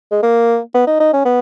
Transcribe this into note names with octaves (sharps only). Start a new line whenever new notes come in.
G#3
A#3
B3
D#4
D#4
C#4
B3